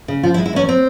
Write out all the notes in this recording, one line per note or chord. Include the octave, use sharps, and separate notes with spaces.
C#3
F3 F4
E4
G#3
E4
E2 C#4
C4